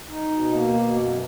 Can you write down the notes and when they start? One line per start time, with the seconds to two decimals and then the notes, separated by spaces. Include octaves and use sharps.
0.09 D#4
0.30 B2
0.53 A#3
0.74 B2
0.95 F#2